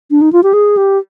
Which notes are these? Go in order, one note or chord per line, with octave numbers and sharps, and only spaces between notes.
D4
D#4
F4
G4
G#4
G4